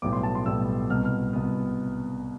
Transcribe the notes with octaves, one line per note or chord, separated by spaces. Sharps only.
B1 A2 G3 B3 D6
C6
A5
C6
B1 A2 G3 B3 E6
C2 B2 B3 F6
F6
C2 B2 B3